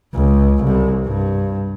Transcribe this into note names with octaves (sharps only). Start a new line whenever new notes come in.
C#2
C2
G2